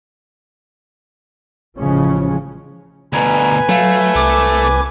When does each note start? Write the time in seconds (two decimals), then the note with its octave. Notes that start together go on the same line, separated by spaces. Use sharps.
1.77 A1 C#3 F3 G#3 C#4
3.13 D2 B2 B4 G#5 A#5
3.69 F#3 A3 F5
4.15 C2 D6